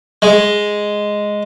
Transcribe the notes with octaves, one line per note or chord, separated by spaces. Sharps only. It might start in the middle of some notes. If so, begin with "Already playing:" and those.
G#3